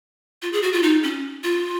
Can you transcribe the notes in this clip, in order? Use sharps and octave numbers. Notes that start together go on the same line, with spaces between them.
F4
G#4
F#4
F4
D#4
C#4
F4